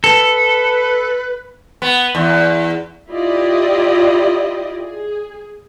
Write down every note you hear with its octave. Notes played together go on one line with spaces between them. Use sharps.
A4 B4
B3
E2
E4 F4 G4 D5 D#5
G#4